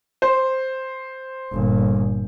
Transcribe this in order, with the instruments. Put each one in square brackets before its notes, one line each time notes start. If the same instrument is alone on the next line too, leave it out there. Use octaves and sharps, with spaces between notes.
[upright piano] C5
[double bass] G1 A#2